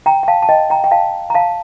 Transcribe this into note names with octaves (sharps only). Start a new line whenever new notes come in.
G5 A#5
G5
F5 A5
A5
D#5 G5
G5 A#5
G5
F5 A5
A#5
F5 A5